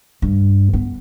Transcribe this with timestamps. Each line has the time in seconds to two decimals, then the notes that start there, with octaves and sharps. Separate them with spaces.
0.22 G2
0.73 B3